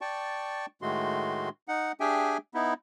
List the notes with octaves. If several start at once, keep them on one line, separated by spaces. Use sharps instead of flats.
D5 G5 A5 C#6
A2 D#3 G#3 A3 F#4 C6
D#4 F#5
D4 G4 G#4 E5 G5 G#5
B3 D#4 E4